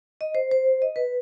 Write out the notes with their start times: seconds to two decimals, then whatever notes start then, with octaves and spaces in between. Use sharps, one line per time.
0.21 D#5
0.35 C5
0.51 C5
0.82 D#5
0.96 B4